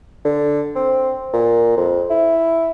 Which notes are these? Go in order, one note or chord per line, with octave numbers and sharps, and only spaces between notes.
D3
C4
A#2
F2
E4